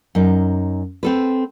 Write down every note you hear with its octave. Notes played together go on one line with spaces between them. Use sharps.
F#2 D#4
C4 A4 B4